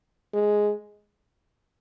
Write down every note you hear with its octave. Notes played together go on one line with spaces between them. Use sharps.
G#3